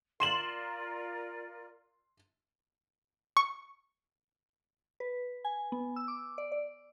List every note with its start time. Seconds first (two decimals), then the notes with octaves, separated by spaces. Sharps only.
0.20 F4 A#4 D5 C6 E7 F#7
3.37 C#6
5.00 B4
5.45 G#5
5.72 B3
5.96 E6
6.08 D6
6.38 D5
6.52 D5